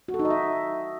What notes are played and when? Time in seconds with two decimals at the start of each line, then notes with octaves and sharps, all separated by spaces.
0.08 F#4
0.14 A4
0.19 D#4
0.25 D#5
0.30 E5